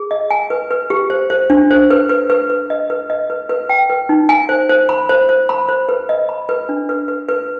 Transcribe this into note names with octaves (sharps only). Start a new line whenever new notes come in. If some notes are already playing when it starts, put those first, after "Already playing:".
Already playing: G#4
D#5
G#5
B4
B4
G4
C5
C5
D4
C5
B4
B4
B4
B4
D#5
B4
D#5
B4
B4
G5
B4
D#4
G#5
C5
C5
B5
C5
C5
B5
C5
B4
D#5
B5
B4
D4
B4
B4
B4